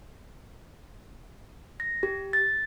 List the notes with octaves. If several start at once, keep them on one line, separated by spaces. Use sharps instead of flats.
A#6
G4
A6